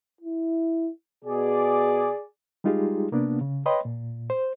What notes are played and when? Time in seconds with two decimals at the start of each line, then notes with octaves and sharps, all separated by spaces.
0.21 E4
1.25 B2 G#4 D5
2.64 G3 G#3 D#4 F4 G4 G#4
3.12 C3 A#3 B3 D4
3.41 C#3
3.66 B4 C#5 D#5 G5 B5 C6
3.85 A#2
4.30 C5